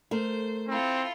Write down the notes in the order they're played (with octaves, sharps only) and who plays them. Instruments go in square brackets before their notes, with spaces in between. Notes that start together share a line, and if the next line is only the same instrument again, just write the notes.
[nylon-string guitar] A3 A#4 [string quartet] C5
[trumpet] C4 [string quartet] E4 F4 A4